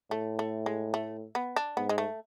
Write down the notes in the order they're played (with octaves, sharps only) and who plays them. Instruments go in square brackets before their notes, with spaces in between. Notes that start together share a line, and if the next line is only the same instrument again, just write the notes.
[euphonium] A2 [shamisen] A3
[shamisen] A3
G#3
A3
B3
D4
[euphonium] G#2 [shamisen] B3
[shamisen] G#3
A3